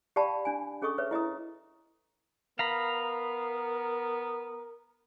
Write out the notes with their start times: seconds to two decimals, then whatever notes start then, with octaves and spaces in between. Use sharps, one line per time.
0.16 G4 D5 F5 G5 A5 B5
0.45 D4 G#5
0.82 C#4 G#4 A4 D#5 C#6 D#6
0.98 B4 C#5 E5
1.11 E4 D#5 A#5 D#6
2.59 B3 A#4 F5 A#5 B5